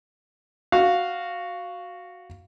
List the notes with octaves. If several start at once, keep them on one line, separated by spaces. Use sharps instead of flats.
F#4 F5